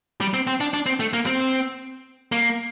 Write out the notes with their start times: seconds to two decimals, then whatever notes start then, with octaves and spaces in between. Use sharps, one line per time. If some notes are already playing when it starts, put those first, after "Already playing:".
0.21 G3
0.34 C4
0.47 C4
0.60 D4
0.74 D4
0.86 C4
1.00 A3
1.13 A#3
1.26 C4
2.32 A#3